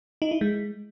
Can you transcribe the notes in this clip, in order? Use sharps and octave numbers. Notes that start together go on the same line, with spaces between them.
D#4
E4
G#3